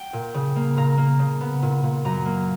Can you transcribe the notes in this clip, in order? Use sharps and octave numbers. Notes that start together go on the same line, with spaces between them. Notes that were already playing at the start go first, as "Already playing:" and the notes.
Already playing: G5
A#2
C#3
A#3
A#2 A#5
A#3
C#3
B3
A#2
A#2
F#2 A#5
A#3